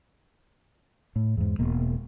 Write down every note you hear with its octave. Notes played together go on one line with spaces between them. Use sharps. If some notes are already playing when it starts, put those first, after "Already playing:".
A2
E2 G#2
E1 B2 A#3